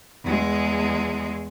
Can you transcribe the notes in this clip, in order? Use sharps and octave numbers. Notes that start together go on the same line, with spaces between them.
E2 G#3